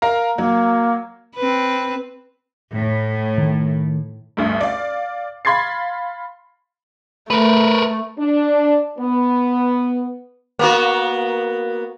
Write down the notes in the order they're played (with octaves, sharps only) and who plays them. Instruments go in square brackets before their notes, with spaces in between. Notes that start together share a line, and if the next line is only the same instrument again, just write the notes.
[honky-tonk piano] A#4 F5 A#5
[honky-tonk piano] F#3 [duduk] A#3
[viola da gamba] C4 B4
[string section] A2
[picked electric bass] D#3 A3
[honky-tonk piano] A1 D2 G2
D5 F5
F5 B5 C6 G#6 A6 C7
[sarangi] A3 [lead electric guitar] A#4 B4
[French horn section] D4
B3
[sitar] A#3 B3 F#4